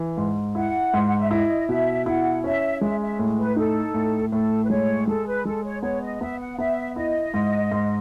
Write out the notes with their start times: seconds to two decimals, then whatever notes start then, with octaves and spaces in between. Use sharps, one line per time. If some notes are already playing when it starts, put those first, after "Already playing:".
Already playing: E3
0.17 G#2
0.55 E4 F#5
0.94 G#2
1.07 F#5
1.19 E5
1.31 E4 D#5
1.69 B2 E5
2.06 E4 F#5
2.44 C#4 E5
2.81 G#3 E5
3.01 E5
3.19 A2
3.38 B4
3.56 D#4 A4
3.94 A2
4.32 A2 A4
4.64 B4
4.70 G#3 C#5
5.07 G#3 A4
5.27 B4
5.45 G#3 A4
5.64 C#5
5.83 B3 C#5
6.02 D#5
6.21 B3 E5
6.39 F#5
6.58 B3 E5
6.96 E4 D#5
7.34 G#2
7.72 G#2